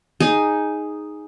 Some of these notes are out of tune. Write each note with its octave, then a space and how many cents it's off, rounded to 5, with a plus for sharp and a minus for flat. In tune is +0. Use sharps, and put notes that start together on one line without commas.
D#4 +0 G#4 +0